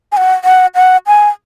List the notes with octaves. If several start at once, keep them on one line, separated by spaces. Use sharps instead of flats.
G#5
F#5
F#5
F#5
G#5